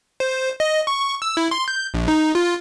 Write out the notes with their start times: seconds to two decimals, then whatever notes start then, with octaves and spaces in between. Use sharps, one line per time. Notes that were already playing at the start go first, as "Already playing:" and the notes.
0.20 C5
0.60 D#5
0.87 C#6
1.22 E6
1.37 E4
1.51 C6
1.68 G6
1.94 A#1
2.08 D#4
2.35 F4